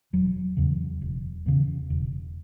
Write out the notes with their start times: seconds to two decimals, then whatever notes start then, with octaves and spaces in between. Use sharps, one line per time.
0.13 E1 F#3
0.57 E2 C#3
1.01 E1
1.46 E2 C#3
1.90 E1